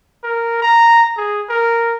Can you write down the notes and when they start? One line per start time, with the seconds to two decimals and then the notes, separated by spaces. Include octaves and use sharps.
0.23 A#4
0.62 A#5
1.17 G#4
1.49 A#4